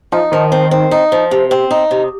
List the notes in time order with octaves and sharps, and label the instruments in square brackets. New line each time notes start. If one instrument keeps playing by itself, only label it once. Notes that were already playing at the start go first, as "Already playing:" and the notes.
[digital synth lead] F3 [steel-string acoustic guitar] D#4
[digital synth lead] D#3 [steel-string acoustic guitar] F3
[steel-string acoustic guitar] C4
C4
D#4
F3
C3
C4
D#4
C3